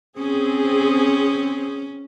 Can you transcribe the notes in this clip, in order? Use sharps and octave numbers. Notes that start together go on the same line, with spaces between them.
C4 C#4 G#4